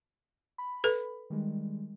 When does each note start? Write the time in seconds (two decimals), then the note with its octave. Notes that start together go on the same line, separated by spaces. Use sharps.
0.58 B5
0.84 A4 B4
1.30 D#3 G3 G#3